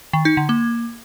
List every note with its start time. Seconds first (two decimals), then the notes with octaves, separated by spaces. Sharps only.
0.13 D#3
0.25 D#4
0.37 D3
0.49 A#3